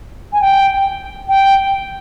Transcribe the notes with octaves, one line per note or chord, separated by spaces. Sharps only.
G#5
G5
G5